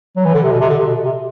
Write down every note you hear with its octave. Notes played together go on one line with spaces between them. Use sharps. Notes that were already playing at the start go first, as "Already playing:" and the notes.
F#3
E3
D3
C3
B2
C3
D3
C3
B2
C3